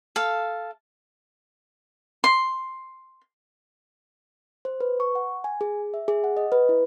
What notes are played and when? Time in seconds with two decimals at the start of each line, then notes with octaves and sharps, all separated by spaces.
0.16 A4 F5
2.24 C6
4.65 C5
4.81 B4
5.00 C#6
5.15 F#5
5.44 G#5
5.61 G#4
5.94 E5
6.08 G#4
6.24 F#5
6.37 D#5
6.52 B4
6.69 E4